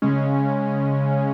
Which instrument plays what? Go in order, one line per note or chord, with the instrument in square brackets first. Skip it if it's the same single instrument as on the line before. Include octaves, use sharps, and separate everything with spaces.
[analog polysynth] C#3 G#3 C#4